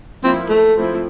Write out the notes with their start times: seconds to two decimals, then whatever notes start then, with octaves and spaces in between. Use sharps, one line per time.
0.23 F3 A#3 C4 E4
0.49 A3
0.77 F3 A3 C4 E4